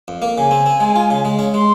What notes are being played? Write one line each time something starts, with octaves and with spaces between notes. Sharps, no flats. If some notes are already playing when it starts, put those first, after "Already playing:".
F2
A#3
C#3 G#5
C4
C4
G#3
F4
C#3
G#3
C#4
G#3 C6